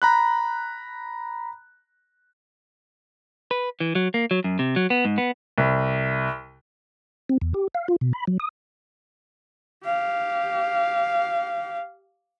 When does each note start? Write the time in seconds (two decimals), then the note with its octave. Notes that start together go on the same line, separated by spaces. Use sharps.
0.02 A#5 B5 F#6
3.51 B4
3.80 E3
3.95 F#3
4.14 A#3
4.31 F#3
4.44 F#2
4.59 C3
4.76 F#3
4.90 B3
5.05 G#2
5.18 B3
5.58 C2
7.29 C4
7.42 E2
7.54 G4
7.75 F5
7.88 F4
8.01 B2
8.13 B5
8.27 F#3
8.40 D#6
9.85 G4 F5